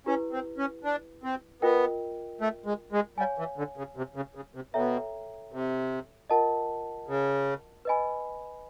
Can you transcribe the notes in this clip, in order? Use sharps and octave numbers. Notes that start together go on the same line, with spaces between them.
C#4 E4 G4 B4
C4
C#4
D4
C4
B3 F4 A#4 D#5 G5
A3
G#3
G#3
G3 C#5 F5 G#5
E3
D3
C#3
C3
C#3
C#3
C3
B2 A4 C#5 E5 G5 A#5
C3
F4 A#4 D#5 F#5 A5
C#3
B4 D#5 G#5 B5